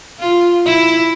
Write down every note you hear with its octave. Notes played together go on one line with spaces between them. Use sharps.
F4
E4